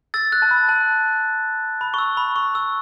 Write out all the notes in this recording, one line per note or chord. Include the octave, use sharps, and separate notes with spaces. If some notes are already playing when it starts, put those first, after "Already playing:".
E6 A6
F#6
A5
B5
A5
B5
C#6
E6
B5
C#6
E6